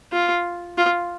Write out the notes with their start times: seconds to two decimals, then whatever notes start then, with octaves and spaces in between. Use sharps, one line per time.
0.12 F4
0.77 F4